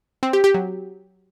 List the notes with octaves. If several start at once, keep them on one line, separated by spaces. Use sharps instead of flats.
C4
G4
G4
F#3